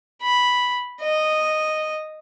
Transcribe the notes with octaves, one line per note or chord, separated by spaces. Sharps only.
B5
D#5